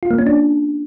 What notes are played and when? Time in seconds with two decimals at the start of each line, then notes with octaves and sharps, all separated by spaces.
0.03 F4
0.11 A#3
0.19 C#4
0.26 D4